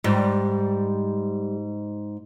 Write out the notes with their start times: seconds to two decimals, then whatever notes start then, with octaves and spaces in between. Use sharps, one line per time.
0.04 G#2 G3